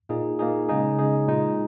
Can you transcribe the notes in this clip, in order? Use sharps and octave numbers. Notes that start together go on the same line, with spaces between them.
A#2 A#3 D#4 G#4
A#2 A#3 D#4 G#4
C#3 G#3 D#4 G#4
C#3 G#3 D#4 G#4
A#2 G#3 D#4